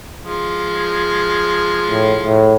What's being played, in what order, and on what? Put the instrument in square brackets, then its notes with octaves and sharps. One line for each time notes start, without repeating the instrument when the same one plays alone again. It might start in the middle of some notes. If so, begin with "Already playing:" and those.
[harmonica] F3 G#3
[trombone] A2
A2